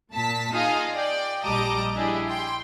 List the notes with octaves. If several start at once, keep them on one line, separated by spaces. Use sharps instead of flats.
A#2 A5 B6
D#4 F4 G#4 D#5 F5
D5 G5
A#1 G3 D#5 A5 A#5 D6
D4 E4 G4 G#4
G5 C6